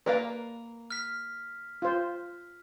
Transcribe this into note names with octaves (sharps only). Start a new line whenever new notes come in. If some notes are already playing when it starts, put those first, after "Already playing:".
A#3 A#4 B4 D5 F5
F6 B6
F4 C5